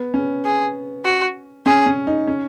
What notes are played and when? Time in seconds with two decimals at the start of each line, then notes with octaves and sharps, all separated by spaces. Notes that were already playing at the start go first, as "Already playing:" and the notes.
Already playing: B3
0.14 C#4
0.45 G#4
1.05 F#4
1.66 C#4 G#4
1.86 C#4
2.07 D#4
2.27 C#4